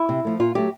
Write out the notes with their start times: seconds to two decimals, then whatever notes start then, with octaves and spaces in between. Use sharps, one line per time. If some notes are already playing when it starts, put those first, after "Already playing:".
Already playing: E4
0.09 C3
0.25 F3 A3
0.40 A#2 F4
0.55 F#3 A3 G4